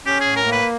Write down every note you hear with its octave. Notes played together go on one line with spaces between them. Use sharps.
C#4 G4
G#4
A2
A#4
A#3
B4